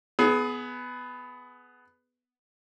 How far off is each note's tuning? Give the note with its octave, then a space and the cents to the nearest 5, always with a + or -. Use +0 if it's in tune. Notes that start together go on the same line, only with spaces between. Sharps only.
B3 +10 G#4 +25